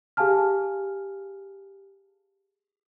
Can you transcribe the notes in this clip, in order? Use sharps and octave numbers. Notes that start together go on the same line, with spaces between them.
G4 G#4 F5 G#5 A5 F6